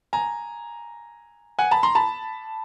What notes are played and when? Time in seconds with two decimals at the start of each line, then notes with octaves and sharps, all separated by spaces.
0.13 G#5 A#5
1.59 F#5 G#5
1.71 A5 B5
1.83 A#5 C6
1.95 A5 B5